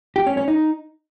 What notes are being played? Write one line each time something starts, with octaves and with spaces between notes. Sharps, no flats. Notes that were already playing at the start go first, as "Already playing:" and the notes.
G4
C#4
C#4
D#4